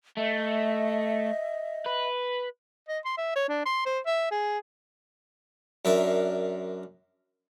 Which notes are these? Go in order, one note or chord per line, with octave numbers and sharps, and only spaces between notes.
A3 D#5 E5
B4
D#5
C6
E5
C#5
D4
C6
C5
E5
G#4
F#2 D4 A#4 E5